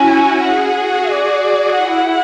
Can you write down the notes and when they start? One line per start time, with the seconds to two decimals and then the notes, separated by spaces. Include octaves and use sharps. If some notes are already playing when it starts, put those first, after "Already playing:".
Already playing: C#4 E4 F#4 G#5
0.11 F#4
0.44 G#4 F#5
0.77 F#4
1.10 G#4 D5
1.42 F#4
1.75 E4 F#5